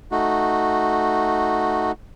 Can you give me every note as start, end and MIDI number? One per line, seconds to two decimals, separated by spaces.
0.12 1.92 57
0.12 1.92 63
0.12 1.92 66